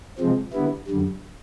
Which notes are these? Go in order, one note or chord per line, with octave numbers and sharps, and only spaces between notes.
C3 F3 G#3 C4
D3 G3 B3 E4
F#2 D3 G3